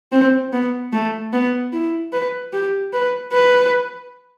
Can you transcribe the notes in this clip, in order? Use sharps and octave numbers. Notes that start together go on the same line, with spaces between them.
C4
B3
A3
B3
E4
B4
G4
B4
B4